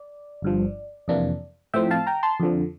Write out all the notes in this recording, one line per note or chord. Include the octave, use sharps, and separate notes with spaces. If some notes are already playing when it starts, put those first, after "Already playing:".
Already playing: D5
G1 G2 F3
F2 C3 E3 A#3 D4
A2 F3 C4 E5 G5
F5 A5
G5 A#5
A5 C6
F2 D3 F3